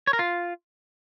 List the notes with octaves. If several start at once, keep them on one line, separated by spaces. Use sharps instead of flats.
C#5
A#4
F4